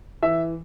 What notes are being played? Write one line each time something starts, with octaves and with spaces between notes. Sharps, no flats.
E3 E5